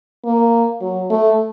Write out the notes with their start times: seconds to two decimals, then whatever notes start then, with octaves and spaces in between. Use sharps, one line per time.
0.25 A#3
0.81 F#3
1.10 A3